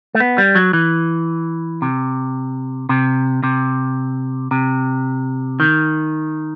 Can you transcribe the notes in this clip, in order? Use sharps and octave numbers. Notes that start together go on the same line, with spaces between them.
A3
B3
G3
F#3
E3
C3
C3
C3
C3
D#3